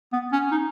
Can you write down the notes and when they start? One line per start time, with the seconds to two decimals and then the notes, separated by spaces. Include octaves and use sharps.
0.12 B3
0.32 C#4
0.52 D#4